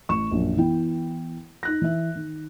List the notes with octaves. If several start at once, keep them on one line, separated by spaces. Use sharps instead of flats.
A1 C#6 E7
A#1 F#2
E3 B3 E4 G5
D#4 F#6 A#6
E3 E5
D#3